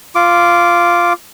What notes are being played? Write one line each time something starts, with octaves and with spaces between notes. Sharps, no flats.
F4 D6